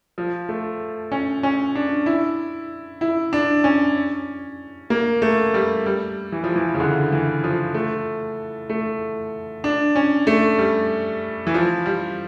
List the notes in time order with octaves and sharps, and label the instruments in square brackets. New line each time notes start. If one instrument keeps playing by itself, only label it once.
[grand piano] F3
A3
C#4
C#4
D4
E4
E4
D4
C#4
A#3
A3
G3
G3
E3
F3
E3
C#3
D3
E3
F3
A3
A3
D4
C#4
A3
G3
E3
F3
G3